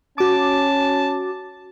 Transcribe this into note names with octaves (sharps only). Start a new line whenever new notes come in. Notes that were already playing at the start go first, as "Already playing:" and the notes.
C#4 F#4 A5 D6